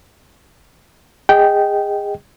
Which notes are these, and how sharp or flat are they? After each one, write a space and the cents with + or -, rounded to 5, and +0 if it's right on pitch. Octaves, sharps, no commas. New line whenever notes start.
G#4 -25 D#5 +0 G5 -15